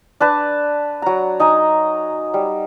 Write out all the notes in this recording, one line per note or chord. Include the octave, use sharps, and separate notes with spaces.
D4 B4 A5
F#3 A#5
D#4 D#5 G#5 A#5
G3